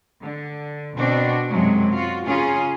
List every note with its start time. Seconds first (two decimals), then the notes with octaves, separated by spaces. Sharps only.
0.22 D3
0.97 B2 C4 D4 F#4
1.49 F#2 C3 F#3 G#3
1.92 F4 F#4
2.27 C#3 C#4 F4 G#4